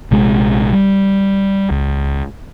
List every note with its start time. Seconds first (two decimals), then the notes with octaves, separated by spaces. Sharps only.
0.11 A#1 C3 G#3
0.73 G3
1.71 C#2